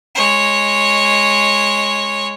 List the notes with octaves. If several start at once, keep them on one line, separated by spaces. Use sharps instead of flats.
G#3 C#5